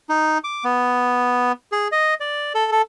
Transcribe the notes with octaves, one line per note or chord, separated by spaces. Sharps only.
D#4
D6
B3
G#4
D#5
D5
A4
A4